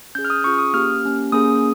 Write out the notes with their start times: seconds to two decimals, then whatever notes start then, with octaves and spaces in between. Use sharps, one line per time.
0.15 C#4 G#4 G6
0.25 F6
0.30 D#6
0.44 C#4 F4 G#4 C#6
0.59 D#6
0.74 A#3 C#4 G4 F6
1.03 A#3 C#4 G4
1.32 A#3 C#4 G#4 D#6